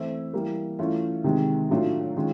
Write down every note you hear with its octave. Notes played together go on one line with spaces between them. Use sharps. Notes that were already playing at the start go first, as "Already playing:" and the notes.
Already playing: E3 A3 C4 E4
E3 G3 A#3
E3 A3 C#4 F4
C3 D#3 G#3
A2 F#3 A3 D4 F4
D#3 G#3 C#4 F4